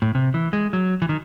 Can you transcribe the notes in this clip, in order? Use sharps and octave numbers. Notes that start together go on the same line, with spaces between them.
A2
C3
E3
G#3
F#3
E3
D#3